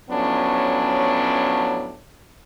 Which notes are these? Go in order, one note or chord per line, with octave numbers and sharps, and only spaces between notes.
A2 F3 F#3 B3 C#4 D4